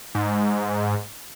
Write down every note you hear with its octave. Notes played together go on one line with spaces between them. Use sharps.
G#2